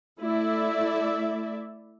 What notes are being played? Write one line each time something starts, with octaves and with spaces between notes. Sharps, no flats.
A3 E4 D5 E5